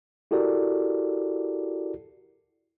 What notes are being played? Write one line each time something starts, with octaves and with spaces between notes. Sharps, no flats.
E4 F#4 G4 A4 A#4 D5